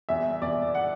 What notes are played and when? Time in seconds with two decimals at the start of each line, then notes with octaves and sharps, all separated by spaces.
0.09 E2 E5
0.42 E2 D5
0.75 F#5